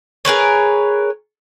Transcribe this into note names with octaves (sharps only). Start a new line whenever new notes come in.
G#4 A#4 B4 C#5